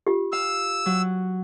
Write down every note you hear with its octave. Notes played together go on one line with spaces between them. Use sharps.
F4 G4
F5 E6
F#3